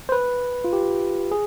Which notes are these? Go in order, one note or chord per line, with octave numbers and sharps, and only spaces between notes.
C5
B4
F4
G4
G#4